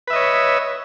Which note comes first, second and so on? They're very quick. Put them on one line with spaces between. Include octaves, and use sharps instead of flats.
B4 E5 D#5 C#5